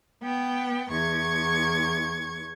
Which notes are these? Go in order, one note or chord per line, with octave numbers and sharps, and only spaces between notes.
B3 G5
E2 C#6 G#6